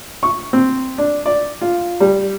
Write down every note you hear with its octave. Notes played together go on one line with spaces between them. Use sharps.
C#6
C4
D4
D5
F4
G3